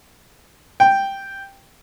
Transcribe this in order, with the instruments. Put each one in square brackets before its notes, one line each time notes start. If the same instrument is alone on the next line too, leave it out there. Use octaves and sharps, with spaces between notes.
[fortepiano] G5